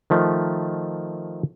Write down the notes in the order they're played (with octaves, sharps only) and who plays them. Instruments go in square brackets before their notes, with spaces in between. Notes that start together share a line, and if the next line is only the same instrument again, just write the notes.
[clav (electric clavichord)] D#3 F3 A3